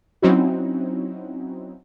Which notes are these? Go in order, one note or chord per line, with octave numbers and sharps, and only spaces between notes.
F#3 C4 C#4 D#4 E4 F#4